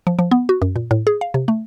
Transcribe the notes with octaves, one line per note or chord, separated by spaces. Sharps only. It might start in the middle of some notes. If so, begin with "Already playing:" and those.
F3
F3
B3
F#4
F#2
A#2
A2
G#4
F5
C3
A3